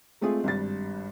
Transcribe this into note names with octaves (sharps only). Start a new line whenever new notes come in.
G#3 A3 C4 F4 G#4
G#1 G2 A6